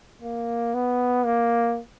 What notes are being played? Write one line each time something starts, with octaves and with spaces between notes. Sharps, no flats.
A#3
B3
A#3